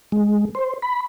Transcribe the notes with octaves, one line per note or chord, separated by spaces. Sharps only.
G#3
C5
B5